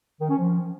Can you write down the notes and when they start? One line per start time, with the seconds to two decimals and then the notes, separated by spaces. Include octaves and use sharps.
0.21 D#3
0.29 C#4
0.38 F3